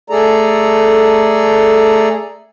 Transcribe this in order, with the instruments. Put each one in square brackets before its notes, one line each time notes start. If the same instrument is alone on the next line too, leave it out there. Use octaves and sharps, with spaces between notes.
[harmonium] A3 G#4 A4 D5 A#5